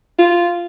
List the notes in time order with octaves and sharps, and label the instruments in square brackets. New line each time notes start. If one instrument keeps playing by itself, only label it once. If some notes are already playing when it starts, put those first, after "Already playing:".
[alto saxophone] F4